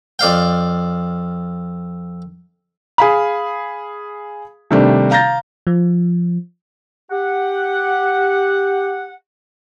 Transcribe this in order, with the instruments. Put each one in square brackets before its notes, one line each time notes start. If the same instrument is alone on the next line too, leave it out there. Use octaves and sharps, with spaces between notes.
[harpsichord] F2 D5 F5 G5
[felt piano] G#4 F5 B5
C3 D#3 G3 A3 D4
F5 A#5 G6 A6 A#6
[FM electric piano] F3
[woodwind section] G4 F#5